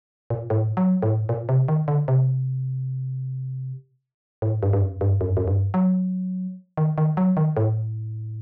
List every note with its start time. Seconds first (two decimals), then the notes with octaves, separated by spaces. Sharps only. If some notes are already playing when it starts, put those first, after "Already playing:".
0.30 A#2
0.50 A2
0.77 F#3
1.03 A2
1.29 A#2
1.49 C3
1.68 D#3
1.88 D3
2.08 C3
4.42 A2
4.63 G2
4.73 G2
4.82 F#2
5.01 G2
5.21 F#2
5.29 G2
5.37 F#2
5.48 G2
5.74 F#3
6.77 D#3
6.98 D#3
7.17 F#3
7.37 D#3
7.57 A2